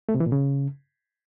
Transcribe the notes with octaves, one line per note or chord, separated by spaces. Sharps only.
A3
C3
E3
A#2
C#3